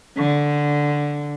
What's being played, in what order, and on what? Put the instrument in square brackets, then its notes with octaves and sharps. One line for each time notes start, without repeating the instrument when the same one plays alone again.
[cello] D3